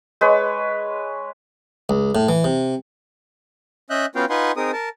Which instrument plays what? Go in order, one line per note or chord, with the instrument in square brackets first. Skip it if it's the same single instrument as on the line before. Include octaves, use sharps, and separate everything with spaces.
[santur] G#3 B4 C#5
[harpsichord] C#2
A2
E3
C3
[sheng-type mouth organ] C#4 D#5 E5 F#6 G6
B3 C#4 F4 F#4 F5 G5
D#4 F4 B4 F#5 G#5 C6
C4 D#4 G#4 A#4 D#6
A#4 A5